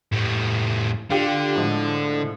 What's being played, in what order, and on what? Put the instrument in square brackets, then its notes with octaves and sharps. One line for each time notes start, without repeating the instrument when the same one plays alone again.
[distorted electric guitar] A2 G3
[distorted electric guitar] D3 [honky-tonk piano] F4 G4
[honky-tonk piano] A2 F3 G#3